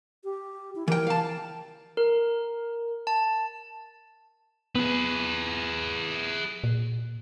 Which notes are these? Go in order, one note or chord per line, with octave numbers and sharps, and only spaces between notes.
G4
E4
E3 A#4 G5
F5 A5
A#4
A5
B3 G#4 B4
A#2